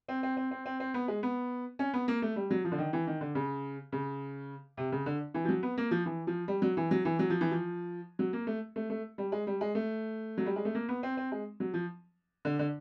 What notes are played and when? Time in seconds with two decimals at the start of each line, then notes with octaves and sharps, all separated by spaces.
0.08 C4
0.23 C4
0.37 C4
0.51 C4
0.66 C4
0.80 C4
0.94 B3
1.08 G#3
1.23 B3
1.79 C#4
1.93 B3
2.08 A#3
2.22 A3
2.36 G3
2.51 F#3
2.65 F3
2.72 D3
2.78 D#3
2.93 E3
3.07 D#3
3.21 D3
3.35 C#3
3.92 C#3
4.77 C3
4.92 C#3
5.06 D3
5.34 E3
5.45 F3
5.49 F#3
5.63 B3
5.78 A#3
5.91 F3
6.06 E3
6.27 F3
6.48 G3
6.62 F#3
6.77 E3
6.91 F#3
7.05 E3
7.19 F#3
7.30 F3
7.41 E3
7.51 F3
8.19 F#3
8.33 A#3
8.47 A3
8.76 A3
8.90 A3
9.18 G3
9.32 G#3
9.47 G3
9.61 G#3
9.75 A3
10.38 F#3
10.46 G3
10.56 G#3
10.65 A3
10.75 A#3
10.89 B3
11.03 C4
11.17 C4
11.32 G#3
11.60 F#3
11.74 F3
12.45 D3
12.59 D3